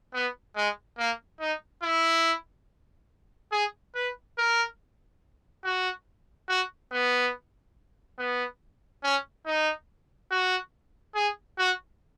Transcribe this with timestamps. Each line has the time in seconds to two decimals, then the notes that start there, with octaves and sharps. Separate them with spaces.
0.14 B3
0.56 G#3
0.98 A#3
1.40 D#4
1.83 E4
3.52 G#4
3.95 B4
4.38 A#4
5.64 F#4
6.49 F#4
6.92 B3
8.19 B3
9.03 C#4
9.46 D#4
10.31 F#4
11.15 G#4
11.58 F#4